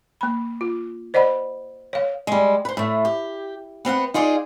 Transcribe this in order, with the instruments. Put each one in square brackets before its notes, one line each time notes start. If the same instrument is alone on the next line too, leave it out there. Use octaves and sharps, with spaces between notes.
[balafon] A#3 B5
F4
C5 D5 D#5 F#5 B5
C#5 F5
[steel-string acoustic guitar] G3 G#3
B4 C5
A2 A3
G4
B3 C4 F5 F#5
D#4 F4 G#4 D5